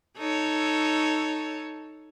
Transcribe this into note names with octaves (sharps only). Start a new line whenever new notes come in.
D#4 A4 C#5